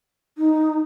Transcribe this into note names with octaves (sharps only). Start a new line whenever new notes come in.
D#4